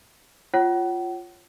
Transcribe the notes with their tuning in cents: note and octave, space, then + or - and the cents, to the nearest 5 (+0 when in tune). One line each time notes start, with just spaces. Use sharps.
F4 +0 C#5 -10 F#5 +40